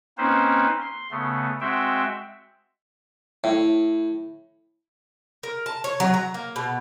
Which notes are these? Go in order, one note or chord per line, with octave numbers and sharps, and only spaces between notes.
A#3 C4 C#4 D#4 B4 C5
C6
C#3 A3 B3
G#3 C4 F#4 E5 G5
A2
A#4
A5
C#5
F#3
A#5
A#3
B2